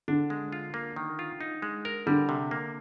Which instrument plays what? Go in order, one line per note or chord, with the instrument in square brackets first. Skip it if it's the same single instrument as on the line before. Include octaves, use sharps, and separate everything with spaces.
[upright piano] D3 [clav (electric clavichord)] D4
[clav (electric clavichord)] G#3
F4
A#3
D#3
F4
D#4
G#3
A#4
[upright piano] D3 [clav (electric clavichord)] G3
[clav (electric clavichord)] C3
A#3